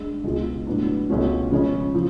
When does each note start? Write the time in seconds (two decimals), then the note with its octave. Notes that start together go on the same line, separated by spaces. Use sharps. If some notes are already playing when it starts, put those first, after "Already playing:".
Already playing: G#3 D4
0.24 C#2 B2 G#3
0.67 A2 F#3 B3 D4
1.09 C#2 B2 A3 C#4 F#4
1.51 C#3 F3 G#3 C#4 G#4
1.95 F3